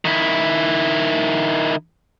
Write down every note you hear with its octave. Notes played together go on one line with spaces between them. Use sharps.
D#3 E4